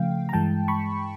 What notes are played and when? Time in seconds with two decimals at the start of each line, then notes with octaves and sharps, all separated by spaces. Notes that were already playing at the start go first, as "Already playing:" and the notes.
Already playing: C#3 F3 A3 F5 G5
0.29 A#5
0.33 G2 E3 G#3 G5 A5
0.68 B5 C#6